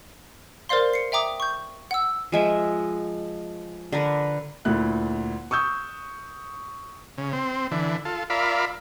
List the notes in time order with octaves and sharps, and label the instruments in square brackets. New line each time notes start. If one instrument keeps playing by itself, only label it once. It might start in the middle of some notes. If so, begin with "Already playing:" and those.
[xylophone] A#4 C5 D5 F5 C6
C7 C#7
E5 G5 A#5 D6 D#6
C#6 G6
F#5 E6
[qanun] F3 G#3 E5
D3 A#4 B4
[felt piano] D2 A#2 E4 F#6
C#6 D#6 E6 G6
[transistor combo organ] C#3
C4
D3 E3
F4 A4
F4 A#4 D5 E5 F5 B5